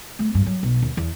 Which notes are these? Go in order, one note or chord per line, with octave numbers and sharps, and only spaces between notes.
A3
G2
F#3
B1
D#2
E2